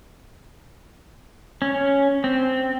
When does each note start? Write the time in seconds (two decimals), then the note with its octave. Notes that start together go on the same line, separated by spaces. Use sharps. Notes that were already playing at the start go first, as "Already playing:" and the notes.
1.62 C#4
2.24 C4